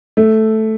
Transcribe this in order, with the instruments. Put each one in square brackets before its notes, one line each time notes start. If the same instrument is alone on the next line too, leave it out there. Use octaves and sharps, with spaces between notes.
[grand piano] A3